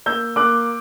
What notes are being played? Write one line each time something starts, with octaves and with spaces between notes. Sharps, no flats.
A#3 E6 G6
A#3 D6 F#6